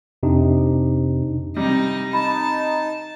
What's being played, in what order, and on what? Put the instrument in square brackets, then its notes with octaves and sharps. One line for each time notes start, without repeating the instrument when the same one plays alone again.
[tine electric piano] F2 C3 D4 D#4
[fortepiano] C3 G3 [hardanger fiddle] D#4
[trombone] D#4 [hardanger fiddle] A5 [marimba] B5